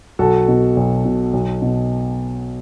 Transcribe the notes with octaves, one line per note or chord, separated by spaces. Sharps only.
B1 F#4 A4
B2
B1
B2
B1
B2